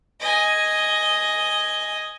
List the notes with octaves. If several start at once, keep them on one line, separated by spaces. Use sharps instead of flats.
D#5 G#5